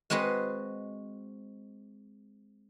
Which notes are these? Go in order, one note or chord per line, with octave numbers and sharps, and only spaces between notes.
G#3 C4 F#4 B4 D#5